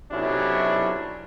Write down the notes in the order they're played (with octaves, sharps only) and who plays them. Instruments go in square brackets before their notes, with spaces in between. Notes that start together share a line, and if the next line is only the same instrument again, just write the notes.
[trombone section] B1 C3 F#3 C#4 D4 E4